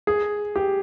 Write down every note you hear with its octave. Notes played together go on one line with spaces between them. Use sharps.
G#4
G4